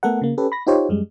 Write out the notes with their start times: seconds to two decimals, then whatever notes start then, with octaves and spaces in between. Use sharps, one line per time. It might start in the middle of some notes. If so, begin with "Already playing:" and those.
0.03 A3 B3 A4 A#4 F#5
0.21 C#3 A#3
0.38 C#4 G4 A4 B4
0.52 B5 A#6
0.67 D#4 F4 G4 C5 C#5
0.89 F#2 G3 G#3